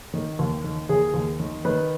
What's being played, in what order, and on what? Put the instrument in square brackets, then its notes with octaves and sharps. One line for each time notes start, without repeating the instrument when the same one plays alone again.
[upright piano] D#3
D#2
D#3
D#2 G#4
D#2
D#3
D#3 B4